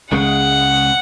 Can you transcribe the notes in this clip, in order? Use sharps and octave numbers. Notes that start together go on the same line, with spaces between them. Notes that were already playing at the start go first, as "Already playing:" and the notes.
C#2 C#3 G#3 F#5